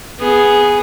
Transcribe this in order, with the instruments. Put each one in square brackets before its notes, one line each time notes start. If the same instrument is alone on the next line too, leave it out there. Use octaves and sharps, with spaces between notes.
[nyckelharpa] B3 G#4